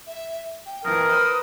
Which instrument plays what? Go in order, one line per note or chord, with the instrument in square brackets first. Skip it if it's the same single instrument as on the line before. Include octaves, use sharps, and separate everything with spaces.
[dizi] E5
G5
[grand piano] F2 E3 [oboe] A#4 [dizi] D#6
[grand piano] B4 C5 D#7